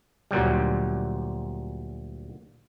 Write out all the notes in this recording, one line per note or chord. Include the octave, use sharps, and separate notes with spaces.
D2 A#2 F#3 G3